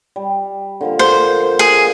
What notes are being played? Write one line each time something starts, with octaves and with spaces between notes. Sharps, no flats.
G3
D3 F3 A#3
A#3 C5
G#4